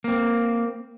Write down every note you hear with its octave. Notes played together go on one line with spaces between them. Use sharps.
A#3 C4